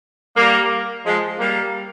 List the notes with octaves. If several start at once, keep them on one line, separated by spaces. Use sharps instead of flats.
G3 A#3
F3 G#3
G3 A#3